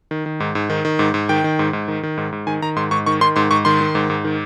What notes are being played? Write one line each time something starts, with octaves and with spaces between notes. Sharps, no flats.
D#3
D#3
G#2
G#2
D#3
D#3
G#2
G#2
D#3 G5
D#3
G#2
G#2
D#3
D#3
G#2
G#2
D#3 G#5
D#3 A#5
G#2 C6
G#2 C#6
D#3 C#6
D#3 C6
G#2 C6
G#2 C#6
D#3 C6
D#3
G#2
G#2
D#3